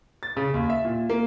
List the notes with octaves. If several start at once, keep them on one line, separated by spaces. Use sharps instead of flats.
A6
C#3
D#2
E5
A#2
A#3